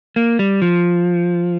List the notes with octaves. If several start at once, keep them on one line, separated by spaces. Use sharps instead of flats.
A#3
G3
F3